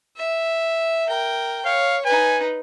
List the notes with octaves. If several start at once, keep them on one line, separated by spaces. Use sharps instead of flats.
E5
A#4 G5
C#5 F5
D#4 B4 G#5